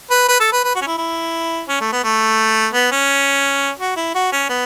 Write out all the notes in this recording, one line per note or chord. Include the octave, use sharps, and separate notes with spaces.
B4
B4
A4
B4
B4
F#4
C#4
E4
E4
C#4
A3
B3
A3
B3
C#4
F#4
E4
F#4
C#4
B3